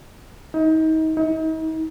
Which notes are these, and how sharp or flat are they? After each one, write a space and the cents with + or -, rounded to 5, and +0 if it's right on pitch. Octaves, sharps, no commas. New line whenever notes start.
D#4 +30
D#4 +40